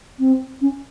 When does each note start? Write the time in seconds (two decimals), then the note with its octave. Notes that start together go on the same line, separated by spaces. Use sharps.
0.19 C4
0.61 C#4